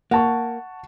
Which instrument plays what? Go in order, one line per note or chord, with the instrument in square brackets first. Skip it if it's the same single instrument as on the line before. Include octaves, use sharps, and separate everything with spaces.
[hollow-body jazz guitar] A#3 [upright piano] F#5 A5 C#6